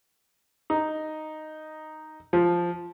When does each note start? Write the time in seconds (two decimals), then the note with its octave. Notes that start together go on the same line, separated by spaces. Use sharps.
0.70 D#4
2.33 F3